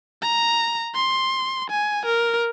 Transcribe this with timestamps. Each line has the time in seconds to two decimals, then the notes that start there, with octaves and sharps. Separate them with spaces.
0.22 A#5
0.95 C6
1.70 G#5
2.05 A#4